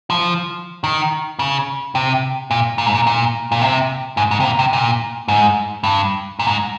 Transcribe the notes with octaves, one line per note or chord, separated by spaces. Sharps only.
F3
D#3
C#3
C3
A#2
A#2
G#2
A#2
A#2
A#2
C3
G#2
G#2
C3
A#2
C3
A#2
G#2
G2
A#2
G#2